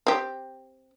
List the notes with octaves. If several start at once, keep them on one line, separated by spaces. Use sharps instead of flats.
C4 G4